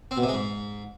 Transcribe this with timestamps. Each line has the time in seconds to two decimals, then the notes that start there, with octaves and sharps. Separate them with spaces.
0.11 C4
0.17 B2
0.23 C3
0.28 G#3
0.34 G#2